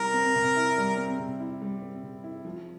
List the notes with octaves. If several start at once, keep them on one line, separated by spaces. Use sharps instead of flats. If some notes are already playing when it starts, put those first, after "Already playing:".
Already playing: C3 G3 C4 E4 A#4
C4
C3
E4
G3
C4
C3
E4
G3
C4
C3
E4
F3